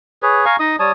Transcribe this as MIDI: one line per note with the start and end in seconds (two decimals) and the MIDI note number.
0.23 0.45 68
0.23 0.45 71
0.23 0.45 73
0.45 0.56 77
0.45 0.56 80
0.45 0.56 82
0.45 0.56 85
0.59 0.76 63
0.59 0.76 75
0.59 0.76 87
0.79 0.92 55
0.79 0.92 73
0.79 0.92 81
0.79 0.92 87